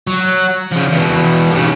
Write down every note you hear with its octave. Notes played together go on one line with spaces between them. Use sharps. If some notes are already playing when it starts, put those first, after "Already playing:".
F#3
C#3 F3
E2 B2
D#2 C#3